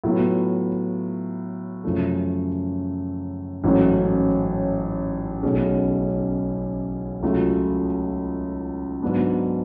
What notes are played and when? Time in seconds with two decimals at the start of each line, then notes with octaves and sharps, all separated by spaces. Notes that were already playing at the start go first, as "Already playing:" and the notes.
0.04 A2 F#3 B3 F4
1.84 F#2 C#3 F3 A3
3.64 A1 G#2 F#3 A3 C#4
5.42 B1 B2 A3 C#4 G#4
7.23 C#2 C#3 F#3 A3 F4
9.02 G#2 F#3 B3 D4